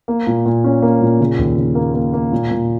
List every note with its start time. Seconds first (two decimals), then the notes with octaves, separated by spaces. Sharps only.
0.08 A#3
0.27 A#2
0.46 A#2
0.64 C#4
0.82 A#3
1.02 A#2
1.20 C#3
1.38 D#2
1.58 C#3
1.75 A#3
1.94 A#3
2.13 A#3
2.32 A#2
2.51 A#2